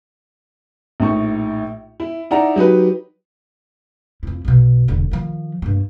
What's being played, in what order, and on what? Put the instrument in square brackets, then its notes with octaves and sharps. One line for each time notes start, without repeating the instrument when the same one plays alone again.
[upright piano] A#1 A2 D#4 C#6
E4
D#4 E4 D5 F#5 A#5
F#3 D#4 G4 B4
[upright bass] F2 E4
B1 B2
E1 D3
D#3 F3
G2 A#3